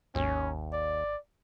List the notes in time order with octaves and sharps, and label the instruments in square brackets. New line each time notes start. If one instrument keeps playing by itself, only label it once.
[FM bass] G#1 [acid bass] D#2 [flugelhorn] C#4
[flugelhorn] D5